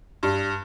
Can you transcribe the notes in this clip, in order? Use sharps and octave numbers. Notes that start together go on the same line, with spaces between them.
G2